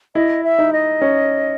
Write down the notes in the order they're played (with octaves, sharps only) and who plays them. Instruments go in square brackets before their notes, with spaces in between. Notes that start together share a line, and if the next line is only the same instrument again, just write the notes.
[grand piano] E4 [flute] D#5
[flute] E5
[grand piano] D#4
[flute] D#5
[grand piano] C#4